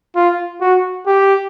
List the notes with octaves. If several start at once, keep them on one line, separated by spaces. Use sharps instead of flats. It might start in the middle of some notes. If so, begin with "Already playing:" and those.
F4
F#4
G4